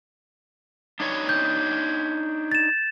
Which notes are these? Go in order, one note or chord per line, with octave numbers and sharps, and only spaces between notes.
D4 D#4 C#5
G6
A6 E7